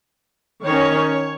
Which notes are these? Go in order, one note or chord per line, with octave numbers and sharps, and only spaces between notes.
D#3 C#4 C#5